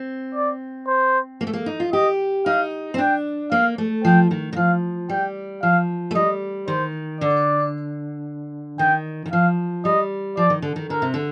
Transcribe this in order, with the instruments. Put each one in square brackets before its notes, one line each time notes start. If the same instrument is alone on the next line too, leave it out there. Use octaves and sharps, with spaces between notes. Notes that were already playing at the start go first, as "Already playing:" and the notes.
Already playing: [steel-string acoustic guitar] C4
[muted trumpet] D5
C5
[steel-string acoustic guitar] A#3
A3
A#3
D#4
F4
[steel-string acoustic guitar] G4 [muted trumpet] D#5
[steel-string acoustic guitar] D#4 [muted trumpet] F5
[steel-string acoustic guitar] C4
[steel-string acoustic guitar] D4 [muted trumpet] G5
[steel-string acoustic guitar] A#3 [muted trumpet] F5
[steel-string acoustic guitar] A3
[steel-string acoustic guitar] F3 [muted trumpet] G5
[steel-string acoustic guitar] D#3
D#3
[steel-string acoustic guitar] F3 [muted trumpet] F5
[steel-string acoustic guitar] G3 [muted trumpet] G5
[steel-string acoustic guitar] F3 [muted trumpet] F5
[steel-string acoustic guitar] A3
[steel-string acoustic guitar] G3 [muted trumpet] D#5
[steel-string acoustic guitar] D#3 [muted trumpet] C5
[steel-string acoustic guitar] D3 [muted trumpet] D5
[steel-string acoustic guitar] D#3 [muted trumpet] G5
[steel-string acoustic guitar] D#3
[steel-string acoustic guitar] F3 [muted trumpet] F5
[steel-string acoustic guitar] G3 [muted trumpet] D#5
[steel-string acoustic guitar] F3 [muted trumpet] D5
[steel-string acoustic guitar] D#3
D3
D#3
[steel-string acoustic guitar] D3 [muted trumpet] A#4
[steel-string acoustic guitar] C3
D3